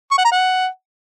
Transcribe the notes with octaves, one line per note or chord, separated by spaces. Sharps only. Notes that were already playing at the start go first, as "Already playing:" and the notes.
C#6
F#5
A#5
F#5